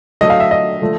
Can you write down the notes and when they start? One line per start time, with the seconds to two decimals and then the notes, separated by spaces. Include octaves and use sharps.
0.21 D3 F#3 A3 D#5
0.30 F5
0.40 E5
0.51 D#5
0.82 D3 F3 A3